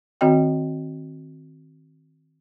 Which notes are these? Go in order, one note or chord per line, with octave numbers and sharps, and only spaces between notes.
D#3 C4 F#4 D#5 G5